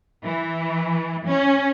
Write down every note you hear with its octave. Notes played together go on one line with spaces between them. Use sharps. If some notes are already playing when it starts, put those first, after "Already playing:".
E3
C#4